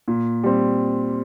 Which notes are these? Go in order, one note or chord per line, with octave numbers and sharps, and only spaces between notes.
A#2
G3 C4